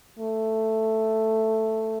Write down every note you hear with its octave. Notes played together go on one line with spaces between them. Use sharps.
A3